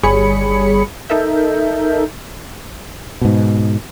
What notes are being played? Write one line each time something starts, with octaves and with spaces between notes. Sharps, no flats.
G1 G3 G#4 C#5 B5 C#7
D#4 A4 A#4 E5 G6
G#2 B2